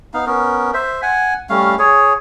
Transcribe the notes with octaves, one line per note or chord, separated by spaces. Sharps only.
B3 D#4 F5
B3 C#4 A#4
C5 E5
F#5 G#5
G3 A3 C#4 F5
G#4 C#5